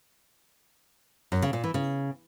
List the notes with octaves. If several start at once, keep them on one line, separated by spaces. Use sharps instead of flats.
F#2
C#3
A#2
E3
C#3